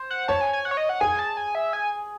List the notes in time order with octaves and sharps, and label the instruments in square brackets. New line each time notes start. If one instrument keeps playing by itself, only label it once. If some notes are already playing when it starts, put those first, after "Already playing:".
Already playing: [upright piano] C5
[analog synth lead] F#5
[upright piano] C#5 [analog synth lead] A5
[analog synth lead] G#5
G#5
F#5
C#5
D#5
F#5
[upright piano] G#4 [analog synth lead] G#5
[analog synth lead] A5
G#5
E5
G#5